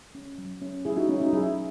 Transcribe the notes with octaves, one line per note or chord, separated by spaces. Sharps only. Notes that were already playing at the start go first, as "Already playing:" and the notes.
C#4
F#3
C#4
F#3 E4 G#4
D#4 F#4
B3 C#4 E4
D#4 F#4
F#3 E4 G#4